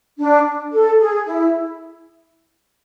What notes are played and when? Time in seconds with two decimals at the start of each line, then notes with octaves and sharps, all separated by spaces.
0.19 D4
0.72 A4
1.00 G#4
1.26 E4